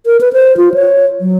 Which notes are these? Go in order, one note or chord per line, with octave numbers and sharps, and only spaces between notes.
A#4
B4
C5
F4
C#5
F#3